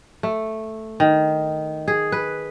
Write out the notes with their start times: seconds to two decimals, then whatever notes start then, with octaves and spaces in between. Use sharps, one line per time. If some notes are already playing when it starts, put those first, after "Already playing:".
0.23 A3
1.00 D#3
1.88 G#4
2.12 B4